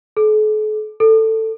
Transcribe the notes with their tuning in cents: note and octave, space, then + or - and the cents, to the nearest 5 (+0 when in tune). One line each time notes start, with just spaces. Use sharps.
A4 -45
A4 +10